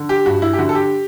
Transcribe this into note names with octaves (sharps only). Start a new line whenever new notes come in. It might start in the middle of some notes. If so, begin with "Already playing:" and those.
Already playing: D3
G4
G2 F#4
E4
G4
D3 F#4
A4
G4